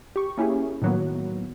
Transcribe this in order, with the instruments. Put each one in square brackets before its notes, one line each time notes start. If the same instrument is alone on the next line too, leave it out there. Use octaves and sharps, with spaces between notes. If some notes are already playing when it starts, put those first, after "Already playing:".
[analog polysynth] G4 C#6
A#3 C#4 E4 G4 G#4
A2 D#3 F#3 A#3 B3